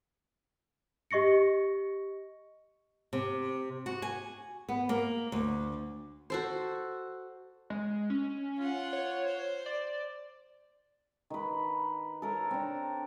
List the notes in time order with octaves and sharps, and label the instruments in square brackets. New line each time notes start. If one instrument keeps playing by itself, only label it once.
[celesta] G4 D#5 C#6 A#6 C#7
[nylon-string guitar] C3
F#4
G#5
B3
A#3
D2
[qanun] F#4 A4 C5
[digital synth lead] G#3
C#4
[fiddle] F4 F#5
[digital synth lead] C#5
[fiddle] C5
[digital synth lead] D5
[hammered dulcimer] D#3 B4
A4 A#4 C#5
C4 D4